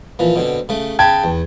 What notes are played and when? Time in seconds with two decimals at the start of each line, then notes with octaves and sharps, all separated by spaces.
0.19 A#2 E3 F3
0.36 B2 D3 C4
0.69 C#3 A3
0.99 C#3 G5 A5 B5 G#6
1.24 E2